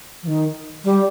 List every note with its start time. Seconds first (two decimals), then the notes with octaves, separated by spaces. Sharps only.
0.23 F3
0.27 D#3
0.84 G3